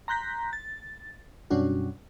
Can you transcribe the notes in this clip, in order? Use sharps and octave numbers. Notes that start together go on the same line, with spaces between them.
A#5 C6 F#6 G6 A#6 B6
A6
F#2 B2 G3 C#4 D4 F#4